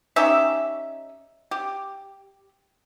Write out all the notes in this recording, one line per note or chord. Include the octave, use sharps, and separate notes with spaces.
C#4 D#4 G4 E5
G4